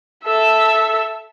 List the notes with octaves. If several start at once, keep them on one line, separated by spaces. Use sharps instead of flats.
A4 E5